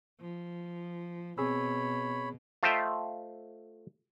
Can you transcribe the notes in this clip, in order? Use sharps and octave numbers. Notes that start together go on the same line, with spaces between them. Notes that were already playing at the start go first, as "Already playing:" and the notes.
F3
B2 C4 G#4 C#5 B5 E6
A3 F4 C5 D#5 E5 G5